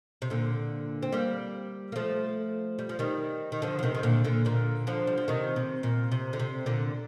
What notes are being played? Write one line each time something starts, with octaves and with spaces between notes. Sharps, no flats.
C3
A#2 D3
C4
G3 A#3
A#3
F3 A3
G3
F3
D#3 G3
D#3
D3 F3
F3
C3 D#3
D#3
A#2 D3
A#2 D3
A#2 D3
D3 F3
G3
F3
C3 D#3
C3
A#2
C3
D3
C3
A#2 D3